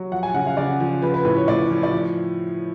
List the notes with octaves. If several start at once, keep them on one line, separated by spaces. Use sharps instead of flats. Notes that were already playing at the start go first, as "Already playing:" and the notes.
Already playing: F#3
F3 F#5
G#5
C#3 F#5
F5
C#3 D5
F3
F3 B4
B4
A2 B4
C#5
A2 D5
F3
D5
F3